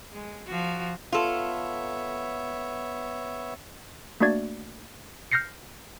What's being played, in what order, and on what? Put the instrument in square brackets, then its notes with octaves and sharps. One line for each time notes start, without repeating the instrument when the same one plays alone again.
[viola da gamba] G#3
F3 F#4
[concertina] B3 C#5 E5 [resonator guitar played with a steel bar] F4 A4
[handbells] A3 A#3 D4 F#4 D5 G#6
F6 G6 A#6 C7 C#7